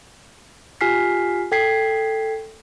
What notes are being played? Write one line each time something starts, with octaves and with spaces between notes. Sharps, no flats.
F4 G4 G#5 F6 B6 C7
A4 G5 G#6 B6 C7